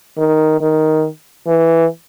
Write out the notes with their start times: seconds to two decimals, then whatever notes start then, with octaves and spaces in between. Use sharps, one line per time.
0.18 D#3
0.61 D#3
1.47 E3